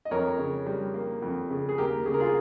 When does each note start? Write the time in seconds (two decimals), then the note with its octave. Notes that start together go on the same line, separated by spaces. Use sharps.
0.05 D#5
0.11 F2 A#4 C#5
0.39 C#3
0.66 G3
0.94 A#3
1.22 F2
1.50 C#3
1.69 G#4
1.78 D#2 G4 A#4
2.06 C#3 G#4
2.14 A#4
2.20 F4 G#4